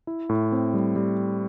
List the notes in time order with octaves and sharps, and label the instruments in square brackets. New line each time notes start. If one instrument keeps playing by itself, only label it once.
[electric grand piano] E4
A2
C4
G3
G3